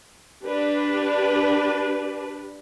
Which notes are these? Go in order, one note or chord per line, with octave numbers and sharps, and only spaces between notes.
D4 G4 B4